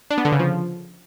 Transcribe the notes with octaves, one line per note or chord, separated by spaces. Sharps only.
D4
B3
D3
C#3
F3